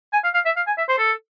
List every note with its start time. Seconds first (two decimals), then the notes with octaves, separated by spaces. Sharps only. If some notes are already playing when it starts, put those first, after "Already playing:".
0.13 G#5
0.24 F5
0.34 F5
0.46 E5
0.57 F5
0.67 G#5
0.78 E5
0.89 C5
0.99 A4